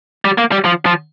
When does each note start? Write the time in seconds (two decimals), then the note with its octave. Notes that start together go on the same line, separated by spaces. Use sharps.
0.25 G3
0.38 A#3
0.52 G3
0.65 F3
0.86 F3